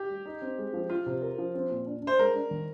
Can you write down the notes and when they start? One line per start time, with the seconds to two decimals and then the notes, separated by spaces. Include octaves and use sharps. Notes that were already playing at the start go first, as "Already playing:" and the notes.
Already playing: G4
0.09 G3
0.26 D#4
0.42 C4
0.58 G#3
0.74 F3
0.90 F3 F4
1.06 C3
1.22 A#4
1.38 F3
1.55 C4
1.70 A#2
1.87 D4
2.02 D4
2.07 C5
2.19 G#3 A#4
2.35 D4
2.51 D#3